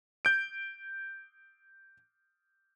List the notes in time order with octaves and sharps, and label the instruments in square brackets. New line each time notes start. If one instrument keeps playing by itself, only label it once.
[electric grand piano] G6 D7